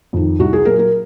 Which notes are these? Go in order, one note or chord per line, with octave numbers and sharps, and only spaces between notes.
F2 D#3
C2 F#4
G#4
A#2 F#3 A#3 A#4
A#4